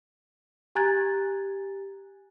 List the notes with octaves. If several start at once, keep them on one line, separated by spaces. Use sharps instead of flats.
G4 G#5 A#5 F#6 G#6 A6